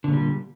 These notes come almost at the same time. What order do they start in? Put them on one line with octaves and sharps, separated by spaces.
D3 A#2 G3